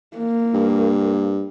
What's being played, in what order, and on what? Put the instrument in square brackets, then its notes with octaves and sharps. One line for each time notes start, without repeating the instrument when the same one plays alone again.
[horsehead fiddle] A#3
[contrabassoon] G2